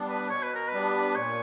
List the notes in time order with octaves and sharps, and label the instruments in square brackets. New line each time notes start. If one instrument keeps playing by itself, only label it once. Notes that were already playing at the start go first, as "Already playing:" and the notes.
Already playing: [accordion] G3 B3 D4
[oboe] B4
[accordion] B2 [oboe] C#5
[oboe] B4
A#4
B4
[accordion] G3 B3 D4
[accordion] A#2 [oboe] C#5